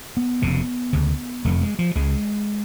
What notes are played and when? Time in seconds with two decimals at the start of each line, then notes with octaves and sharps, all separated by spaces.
0.17 B3
0.42 F1 F2 C#3
0.93 D2 C#3
1.45 F1 F2 D3 A3
1.62 G#3
1.79 F3
1.96 C#2 C#3 G#3